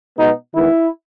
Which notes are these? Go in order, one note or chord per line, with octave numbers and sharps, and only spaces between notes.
B2 G#3 B3 D#4
D#3 G#3 B3 E4